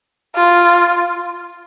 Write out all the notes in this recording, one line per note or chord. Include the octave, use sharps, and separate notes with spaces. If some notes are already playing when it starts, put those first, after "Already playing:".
F4